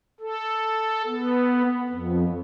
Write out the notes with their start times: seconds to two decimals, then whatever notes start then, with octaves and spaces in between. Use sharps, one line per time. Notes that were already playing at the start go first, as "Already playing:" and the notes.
0.21 A4
1.07 B3
1.89 F2